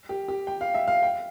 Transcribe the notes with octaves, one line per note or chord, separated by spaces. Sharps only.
G4
G4
G5
F5
E5
F5
G5